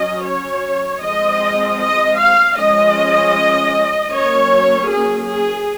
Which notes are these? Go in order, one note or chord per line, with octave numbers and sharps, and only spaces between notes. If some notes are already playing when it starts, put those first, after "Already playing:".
Already playing: F#3 C#4 D#5
C#5
F3 G#3 C4 D#5
D#5
F5
F3 G#3 C#4 D#5
F#3 A#3 C#4 C#5
G#4
G#4